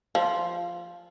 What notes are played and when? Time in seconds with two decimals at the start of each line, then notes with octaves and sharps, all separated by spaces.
0.15 F3